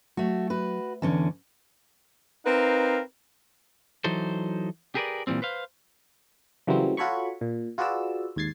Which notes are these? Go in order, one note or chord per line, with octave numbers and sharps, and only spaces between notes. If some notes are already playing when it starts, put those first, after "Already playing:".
F#3 A3 F#4
F#4 B4
E2 D3 E3 C#4
C4 D#4 A#4 B4 F5
E3 F#3 D#4 A4 C5
G4 G#4 A#4 B4 C#5 D5
A#2 C#3 E3 G3 C4
B4 C5 F5
C#3 E3 F#3 G3 A#3 C4
F4 F#4 A4 C#5 B5 C#6
A#2
F4 F#4 G#4 B4 D5 E6
D#2 G#2 G#6 A6 C7